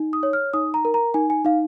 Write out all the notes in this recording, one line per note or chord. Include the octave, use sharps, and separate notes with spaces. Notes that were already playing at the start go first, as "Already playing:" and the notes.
Already playing: D#4
D#6
C#5
F6
D#4 D#6
A#5
A#4
A#5
D#4 G#5
G#5
D#4 F5